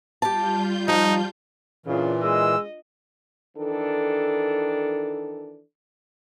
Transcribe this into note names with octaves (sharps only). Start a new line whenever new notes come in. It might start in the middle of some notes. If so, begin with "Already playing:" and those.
G3 F4 G4 A5 G6
F3 D#4
A#2 C#3 E3 D4 F4
G#3 D#5 E6
D#3 E3 D4 A4